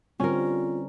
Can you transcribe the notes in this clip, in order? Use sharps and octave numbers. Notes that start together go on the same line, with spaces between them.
D3 G3 C4 C#4 F4 A#4